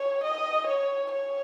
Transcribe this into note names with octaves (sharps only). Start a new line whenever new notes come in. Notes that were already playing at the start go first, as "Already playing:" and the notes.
Already playing: C#5
D#5
C#5
C#5